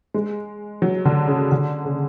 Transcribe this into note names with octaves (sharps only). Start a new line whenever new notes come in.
G#3
F#3
D3
C#3
D3
C#3